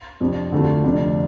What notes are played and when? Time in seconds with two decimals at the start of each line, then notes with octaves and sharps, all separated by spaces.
0.20 F2 C3 F3 D4
0.52 D2 D3 A3 F4 A4
0.84 F1 F2 D3 A3 D4